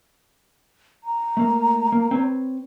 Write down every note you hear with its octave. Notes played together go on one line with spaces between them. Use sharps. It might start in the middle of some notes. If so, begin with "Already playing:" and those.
A#5
A3 A#3
A#3
C4 B4 C#5